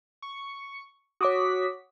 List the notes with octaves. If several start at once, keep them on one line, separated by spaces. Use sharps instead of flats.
C#6
F#4 C#5 D6 D#6 B6